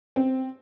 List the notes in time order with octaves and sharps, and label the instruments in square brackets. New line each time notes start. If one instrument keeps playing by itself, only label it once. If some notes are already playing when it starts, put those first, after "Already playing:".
[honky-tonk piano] C4